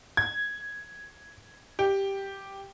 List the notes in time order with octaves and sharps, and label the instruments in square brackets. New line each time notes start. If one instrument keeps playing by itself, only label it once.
[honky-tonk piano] G#6
G4